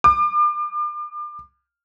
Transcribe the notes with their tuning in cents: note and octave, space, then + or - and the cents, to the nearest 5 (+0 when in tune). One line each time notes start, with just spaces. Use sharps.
D6 +35